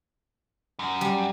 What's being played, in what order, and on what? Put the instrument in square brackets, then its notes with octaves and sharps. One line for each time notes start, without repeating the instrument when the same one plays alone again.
[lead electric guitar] F#2
[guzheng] G3